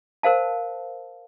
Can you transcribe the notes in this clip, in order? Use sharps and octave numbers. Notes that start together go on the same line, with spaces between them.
A#4 C5 F5 A5